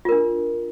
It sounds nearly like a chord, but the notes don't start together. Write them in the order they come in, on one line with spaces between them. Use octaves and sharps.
F4 A#4 D4